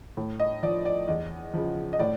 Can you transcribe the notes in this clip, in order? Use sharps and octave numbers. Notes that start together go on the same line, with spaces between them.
A2
D#5
F3 D5
D5
E2 D#5
C#3 F3
D#5
A2 D5